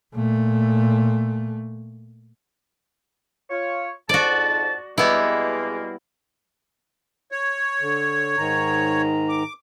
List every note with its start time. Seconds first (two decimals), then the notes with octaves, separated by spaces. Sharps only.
0.14 A#2 A3
3.50 F4 C#5
4.09 F2 G#2 F#4 D5 A5
4.98 B2 G3 G#3 A#3 B3 E4
7.32 C#5
7.81 D3
8.37 G#2 D#3 A#5
9.29 D6